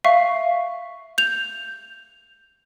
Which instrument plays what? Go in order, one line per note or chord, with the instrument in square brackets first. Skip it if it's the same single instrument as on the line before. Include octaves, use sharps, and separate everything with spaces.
[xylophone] E5 F5 C#6
G6 F7